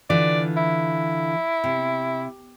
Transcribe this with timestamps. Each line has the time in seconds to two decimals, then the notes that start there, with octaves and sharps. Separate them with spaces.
0.10 D3 E3 F4 D5
0.57 E4
1.64 C3